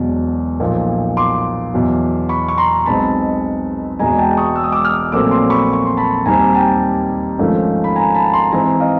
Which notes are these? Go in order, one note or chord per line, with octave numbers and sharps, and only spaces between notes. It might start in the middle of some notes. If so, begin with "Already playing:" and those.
Already playing: E1 E2 B2 F#3
B1 A#2 F3
C6 D6
E2 B2 F#3
B5 C#6
C#6
A#5 C6
B1 B2 G#3 C4 A5 B5
E1 E2 B2 G#3 G#5 A#5
G5 A5
C#6 D#6
E6
D#6
D6 E6
D#6 F6
A#1 A#2 F#3 A3 C4 D6 E6
C6 D6
B5 C#6
C#6
C6
A5 B5
D#2 D#3 G3 C4 D#4 G#5 A#5
G5 A5
G#1 G#2 F3 A3 C#4
B5
G#5 A#5
A5 B5
A#5 C6
G#2 E3 G#3 C4 G#5 A#5
D#5 F5